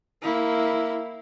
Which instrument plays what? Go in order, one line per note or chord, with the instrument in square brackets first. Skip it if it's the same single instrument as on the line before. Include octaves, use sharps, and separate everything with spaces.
[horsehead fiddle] A#3 E4